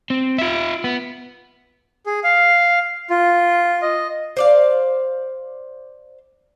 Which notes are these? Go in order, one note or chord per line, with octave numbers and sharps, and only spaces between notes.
C4
F4 E5
B3
G#4
F5
F4
D#5
C5 D5 F5